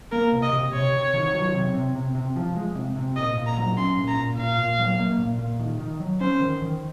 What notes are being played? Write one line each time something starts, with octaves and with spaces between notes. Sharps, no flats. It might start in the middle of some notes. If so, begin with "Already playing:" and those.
A#3 A#4
C3
D#5
C3
C3 C#5
C3
D#3
F#3
C3
C3
C3
C3
F3
G#3
C3
C3
A#2 D#5
A#2
A#5
F#3
C#4 C6
A#2
A#5
A#2
A#2 F5
A#2
F#3
A#3
A#2
A#2
D#3
D#3
F#3
C#4 C5
D#3
D#3